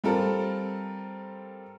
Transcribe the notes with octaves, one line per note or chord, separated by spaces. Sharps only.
G3 C4 F4 A4 A#4